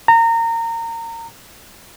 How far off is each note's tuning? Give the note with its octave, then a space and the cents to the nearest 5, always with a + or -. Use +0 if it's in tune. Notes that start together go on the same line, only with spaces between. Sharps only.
A#5 -25